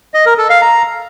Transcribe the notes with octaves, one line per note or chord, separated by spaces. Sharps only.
D#5
A#4
A4
F5
A#5